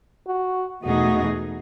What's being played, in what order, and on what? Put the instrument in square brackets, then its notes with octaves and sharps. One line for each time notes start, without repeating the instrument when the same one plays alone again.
[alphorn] F#4
[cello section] E2 B2 A3 D#4 G#4 [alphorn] F#4